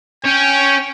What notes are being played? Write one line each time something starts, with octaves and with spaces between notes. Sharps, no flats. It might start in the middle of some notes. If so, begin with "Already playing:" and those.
C#4 C#5 G5